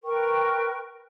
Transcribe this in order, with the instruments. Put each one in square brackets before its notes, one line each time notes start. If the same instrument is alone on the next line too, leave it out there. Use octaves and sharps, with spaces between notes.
[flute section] A#4 B4 G5 C#6